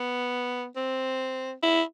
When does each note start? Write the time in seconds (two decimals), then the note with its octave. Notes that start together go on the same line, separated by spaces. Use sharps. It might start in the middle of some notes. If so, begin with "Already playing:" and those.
Already playing: B3
0.76 C4
1.63 E4